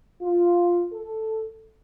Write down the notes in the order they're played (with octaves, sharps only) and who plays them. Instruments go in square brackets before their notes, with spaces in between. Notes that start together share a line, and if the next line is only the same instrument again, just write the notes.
[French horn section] F4
A4